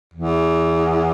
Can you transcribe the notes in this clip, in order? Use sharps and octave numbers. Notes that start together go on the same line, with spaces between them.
E2